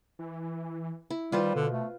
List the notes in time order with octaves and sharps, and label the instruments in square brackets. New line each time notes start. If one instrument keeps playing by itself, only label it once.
[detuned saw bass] E3
[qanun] E4
[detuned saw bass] D#3 [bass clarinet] G3 [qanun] F4 B4 C5
[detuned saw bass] B2 [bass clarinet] D3
[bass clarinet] A3